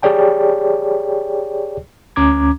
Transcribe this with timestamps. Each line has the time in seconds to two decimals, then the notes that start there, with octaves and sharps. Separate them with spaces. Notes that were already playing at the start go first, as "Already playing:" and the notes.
0.03 G4 G#4 C#5 D5 G5 A5
2.16 D2 C#4 A#5 D6 G#6